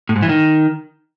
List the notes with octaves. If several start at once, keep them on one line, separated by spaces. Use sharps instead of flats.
A2
G#2
E3
D#3